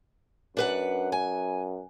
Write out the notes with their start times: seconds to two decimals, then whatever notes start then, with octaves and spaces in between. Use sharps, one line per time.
0.57 F#2 D4 B4 F#5
1.12 G#5